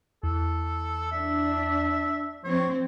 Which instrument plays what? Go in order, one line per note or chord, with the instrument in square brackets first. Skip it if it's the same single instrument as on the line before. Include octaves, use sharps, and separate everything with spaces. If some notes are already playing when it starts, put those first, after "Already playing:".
[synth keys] E2 [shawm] A4
[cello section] D4 [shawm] E5
[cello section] F3 C4 [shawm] C#5